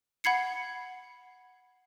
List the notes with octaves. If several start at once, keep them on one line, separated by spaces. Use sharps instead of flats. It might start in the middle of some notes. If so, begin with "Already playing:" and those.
F#5 B5 G#6 C7 C#7